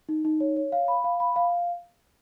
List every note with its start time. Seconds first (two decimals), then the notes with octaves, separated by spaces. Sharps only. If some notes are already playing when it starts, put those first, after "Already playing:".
0.09 D#4
0.25 D#4
0.40 C#5
0.56 C#5
0.72 F5
0.88 B5
1.04 F5
1.20 B5
1.36 F5